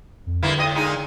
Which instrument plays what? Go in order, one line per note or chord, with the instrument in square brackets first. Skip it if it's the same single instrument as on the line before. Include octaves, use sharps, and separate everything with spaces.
[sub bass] F2
[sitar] G2 A#3 E4 [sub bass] D3
[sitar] A2 D#5
A#2 G#3 D#4